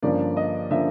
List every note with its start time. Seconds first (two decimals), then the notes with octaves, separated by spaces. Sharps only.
0.02 G2 D3 F3 A#3 C#4 D5
0.37 D#5
0.71 D3 F3 A#3 C#4 E5